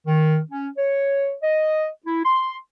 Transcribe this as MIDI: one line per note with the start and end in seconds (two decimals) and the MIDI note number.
0.07 0.39 51
0.51 0.68 61
0.78 1.34 73
1.43 1.87 75
2.06 2.22 64
2.25 2.56 84